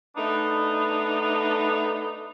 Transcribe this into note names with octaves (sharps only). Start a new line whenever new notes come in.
A3 B3 D4 D#4